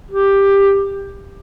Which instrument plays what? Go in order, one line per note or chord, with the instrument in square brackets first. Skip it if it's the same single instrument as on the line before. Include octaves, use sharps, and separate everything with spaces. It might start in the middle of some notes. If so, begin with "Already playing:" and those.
[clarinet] G4